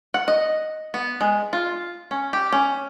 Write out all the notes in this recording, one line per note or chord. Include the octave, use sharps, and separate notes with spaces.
F#5
D#5
B3
G#3
F4
C#4
G4
C#4